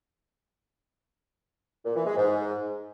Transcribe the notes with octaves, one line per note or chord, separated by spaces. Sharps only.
A#2
E3
G#3
G#2